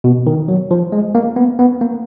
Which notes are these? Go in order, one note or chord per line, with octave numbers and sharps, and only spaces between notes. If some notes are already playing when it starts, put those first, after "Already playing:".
B2
D#3
F#3
F3
G#3
A#3
B3
B3
A#3